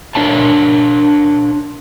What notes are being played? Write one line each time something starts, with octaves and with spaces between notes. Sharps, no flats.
D4 A#4 C#5 E5 A5